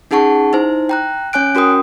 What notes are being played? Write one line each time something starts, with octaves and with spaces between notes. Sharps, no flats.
C#4 D#4 G#4 F#5 A5 C#6
D#4 E4 C5
G5 A#5 F#6
C#4 C#5 G#5 F#6 D7
C#4 F#4 A#4 G5 D#6